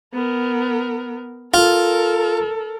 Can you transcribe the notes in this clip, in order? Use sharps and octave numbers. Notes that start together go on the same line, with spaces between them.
B3 A#4
F4 A4 A#4